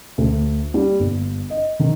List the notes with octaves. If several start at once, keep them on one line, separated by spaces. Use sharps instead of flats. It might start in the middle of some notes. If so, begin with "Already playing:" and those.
D2
G3
G1
D#5
D#3